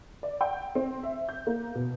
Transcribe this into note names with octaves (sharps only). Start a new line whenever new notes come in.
D5
G5
C4
E5
G6
A#3
B2